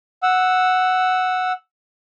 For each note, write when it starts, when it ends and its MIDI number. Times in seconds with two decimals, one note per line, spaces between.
0.23 1.52 78
0.23 1.52 88